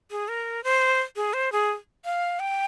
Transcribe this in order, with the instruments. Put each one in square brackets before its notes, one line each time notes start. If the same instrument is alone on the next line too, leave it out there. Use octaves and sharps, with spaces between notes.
[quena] G#4
A#4
C5
G#4
C5
G#4
F5
G5